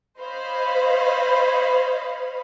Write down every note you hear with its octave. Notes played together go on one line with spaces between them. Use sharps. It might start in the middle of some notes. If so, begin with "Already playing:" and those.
C5 C#5 D#5 F5 B5